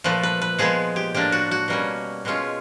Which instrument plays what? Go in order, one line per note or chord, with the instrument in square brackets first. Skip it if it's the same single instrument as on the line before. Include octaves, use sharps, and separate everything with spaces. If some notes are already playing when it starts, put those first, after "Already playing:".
[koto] A#2 F3 A3 B4
B4
B4
A#2 F3 G#3 B3 G#4
G4
A2 F3 A#3 D4 G4
F#4
F#4
B2 G3 A#3 C#4
B2 G#3 C#4 F4